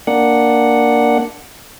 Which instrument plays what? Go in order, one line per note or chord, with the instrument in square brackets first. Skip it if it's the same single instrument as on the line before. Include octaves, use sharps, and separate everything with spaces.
[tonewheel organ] A#3 D4 F#5